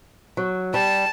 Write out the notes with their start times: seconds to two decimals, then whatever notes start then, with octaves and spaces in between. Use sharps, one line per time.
0.37 F#3
0.74 G3 A5